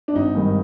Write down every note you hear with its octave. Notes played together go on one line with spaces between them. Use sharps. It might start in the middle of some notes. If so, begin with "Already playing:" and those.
D4
G#1 D#4
G2 D#3 G#3